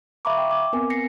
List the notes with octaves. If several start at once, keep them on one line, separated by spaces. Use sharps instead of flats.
E5 F5 A#5 B5 C#6 D6
G5
D6
B3 C4 A#4 G#5
A#6 C7 C#7